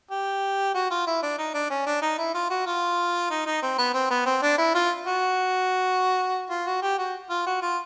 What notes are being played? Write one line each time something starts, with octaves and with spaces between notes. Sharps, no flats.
G4
F#4
F4
E4
D4
D#4
D4
C#4
D4
D#4
E4
F4
F#4
F4
D#4
D#4
C4
B3
C4
B3
C4
D4
E4
F4
F#4
F4
F#4
G4
F#4
F4
F#4
F4